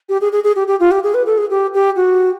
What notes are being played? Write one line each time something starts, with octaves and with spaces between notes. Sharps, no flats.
G4
G#4
G#4
G#4
G4
G4
F4
G4
G#4
B4
A4
G#4
G4
G4
F#4